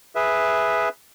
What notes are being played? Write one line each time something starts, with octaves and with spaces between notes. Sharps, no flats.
G#4 B4 E5